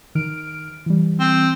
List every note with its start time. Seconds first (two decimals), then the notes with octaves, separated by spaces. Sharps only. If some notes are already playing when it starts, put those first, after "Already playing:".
0.15 D#3 F6 D7
0.86 E3 G3
1.20 C4